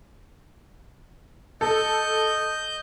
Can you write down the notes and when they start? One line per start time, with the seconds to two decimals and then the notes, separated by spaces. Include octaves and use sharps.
1.61 A4 D#5 G6